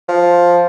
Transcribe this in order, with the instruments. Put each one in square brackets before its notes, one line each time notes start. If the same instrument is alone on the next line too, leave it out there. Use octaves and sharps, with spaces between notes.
[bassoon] F3